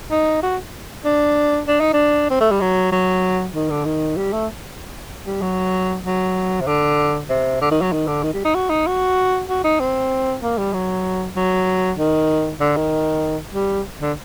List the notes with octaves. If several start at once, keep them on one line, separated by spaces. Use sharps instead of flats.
D#4
F#4
D4
D4
D#4
D4
C4
A3
G3
F#3
F#3
D#3
D3
D#3
G3
A3
G3
F#3
F#3
C3
D3
C3
D3
D#3
F#3
D#3
D3
D#3
G3
D#4
F#4
D#4
F#4
F#4
D#4
C4
A#3
G3
F#3
F#3
D#3
D3
D#3
G3
D3